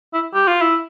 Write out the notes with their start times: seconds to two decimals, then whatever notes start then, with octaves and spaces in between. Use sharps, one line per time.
0.14 E4
0.35 G4
0.48 F4
0.62 E4